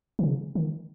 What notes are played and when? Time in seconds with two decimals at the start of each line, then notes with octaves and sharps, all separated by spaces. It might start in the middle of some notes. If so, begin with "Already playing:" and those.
0.19 D#3
0.23 C#3
0.55 D#3